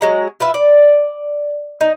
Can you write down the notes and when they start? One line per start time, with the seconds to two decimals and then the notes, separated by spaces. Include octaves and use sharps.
0.01 F#3 G#3 A#5
0.40 F4 B4 E5
0.54 D5
1.81 D#4